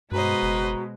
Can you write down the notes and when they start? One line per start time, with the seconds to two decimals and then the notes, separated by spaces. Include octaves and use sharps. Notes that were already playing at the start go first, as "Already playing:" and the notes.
0.12 G2 B2 G#3 F#4 B4 C5 D#5 A#5
0.42 F#1